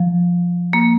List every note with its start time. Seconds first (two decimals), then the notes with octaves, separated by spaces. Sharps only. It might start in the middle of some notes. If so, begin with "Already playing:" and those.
Already playing: F3
0.73 A#3